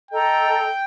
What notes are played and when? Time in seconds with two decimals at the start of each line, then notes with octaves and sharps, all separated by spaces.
0.11 A4 D#5 G5 A#5